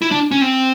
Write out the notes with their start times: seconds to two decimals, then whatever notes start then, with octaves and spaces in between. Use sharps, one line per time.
0.02 E4
0.11 D4
0.31 C#4
0.41 C4